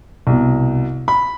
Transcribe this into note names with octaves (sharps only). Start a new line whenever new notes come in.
C2 B2
B5